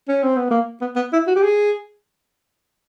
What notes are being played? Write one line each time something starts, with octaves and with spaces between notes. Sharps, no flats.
C#4
C4
B3
A#3
B3
B3
E4
F#4
G4
G#4